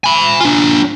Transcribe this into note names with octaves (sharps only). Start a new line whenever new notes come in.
G#5 B5
D4 F4